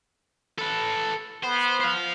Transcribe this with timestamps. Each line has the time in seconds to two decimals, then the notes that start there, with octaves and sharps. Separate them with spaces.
0.59 A4 B4
1.44 B3 C5
1.81 C5 F5